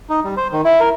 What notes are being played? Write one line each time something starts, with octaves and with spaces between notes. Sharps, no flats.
D#4
G3
C5
D#3
E4
A#4